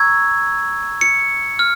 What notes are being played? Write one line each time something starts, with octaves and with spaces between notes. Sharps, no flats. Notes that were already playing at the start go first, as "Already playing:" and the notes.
Already playing: A#5 C#6 E6 G#6
C#7
F6